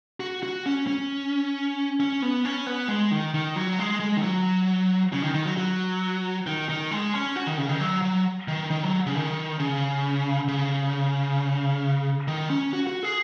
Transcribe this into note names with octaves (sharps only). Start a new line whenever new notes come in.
F#4
F#4
C#4
C#4
C#4
B3
C#4
B3
G#3
D#3
D#3
F#3
G#3
G#3
D#3
F#3
C#3
D#3
D#3
F#3
F#3
D#3
D#3
G#3
C#4
F#4
D#3
C#3
D#3
F#3
F#3
D#3
D#3
F#3
C#3
D#3
C#3
C#3
D#3
C#4
F#4
F#4
G#4